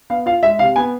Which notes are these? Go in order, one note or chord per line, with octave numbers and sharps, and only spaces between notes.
B3 F5
F4 F5
G#3 E5
C3 F5
B3 G#5